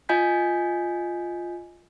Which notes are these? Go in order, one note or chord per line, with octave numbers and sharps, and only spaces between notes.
F4 D#5 G#5 G6 B6